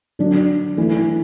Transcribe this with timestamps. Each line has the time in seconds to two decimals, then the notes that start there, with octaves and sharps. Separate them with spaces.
0.19 D3 F#3 D4
0.77 E3 A3 E4